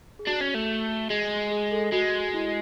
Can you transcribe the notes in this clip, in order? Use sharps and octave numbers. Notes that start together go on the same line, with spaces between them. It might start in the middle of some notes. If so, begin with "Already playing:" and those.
G#4
D4 F#4
C#4
A3
G#3 G#4
G#4
A4
G#3 F#4
E4